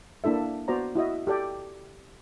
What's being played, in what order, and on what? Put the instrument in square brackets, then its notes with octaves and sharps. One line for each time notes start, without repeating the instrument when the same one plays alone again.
[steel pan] A#3 D4 E4 A4 E5
B3 F#4 C5 D5 A#5
E4 F#4 D#5 E5
G4 A4 D5 G5